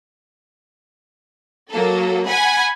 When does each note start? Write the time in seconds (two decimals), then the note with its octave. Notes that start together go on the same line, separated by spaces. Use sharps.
1.71 F#3 A#3 A4
2.27 F#5 G#5 B5